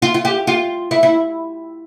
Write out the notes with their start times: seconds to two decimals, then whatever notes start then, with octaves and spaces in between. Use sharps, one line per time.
0.02 F4
0.14 F4
0.25 G4
0.47 F4
0.91 E4
1.03 E4